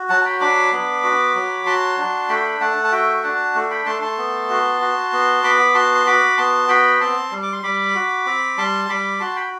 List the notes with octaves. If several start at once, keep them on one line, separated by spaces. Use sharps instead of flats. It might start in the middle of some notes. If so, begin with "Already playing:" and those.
Already playing: F#4
F#3 F#5 A5
A5
G5 B5
D4 B5 D6
B3
F#4
F#3
F#4 A5 C6
D4
A3 G5 B5
A3 F#5 A5
A5
F#4 E5 G5
D4 F#5 A5
A3
G5 B5
A3 A5 C6
A5 C6
B3
F#4
F#4
B3
B3 B5 D6
F#4 A5 C6
C6
F#4 B5 D6
B3 A5 C6
F#4 G5 B5
C4 A5 C6
G3
D6
C6
G3 B5 D6
F#4
C4
G3 A5 C6
G3 B5 D6
F#4 A5 C6
G5 B5